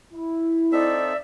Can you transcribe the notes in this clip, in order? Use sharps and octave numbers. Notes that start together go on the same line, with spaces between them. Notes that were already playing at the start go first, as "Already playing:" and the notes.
E4
C4 D#4 A4 D5 E5